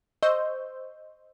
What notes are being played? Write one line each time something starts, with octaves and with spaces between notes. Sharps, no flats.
C5 D#5 C6 C#6 E6 G6